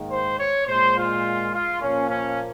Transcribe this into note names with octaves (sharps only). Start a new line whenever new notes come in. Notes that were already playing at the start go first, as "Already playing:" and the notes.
Already playing: G#2 D#3 A#3
C5
C#5
A#2 G#3 C5
F4
F4
A#2 F3 A#3 C#4
C#4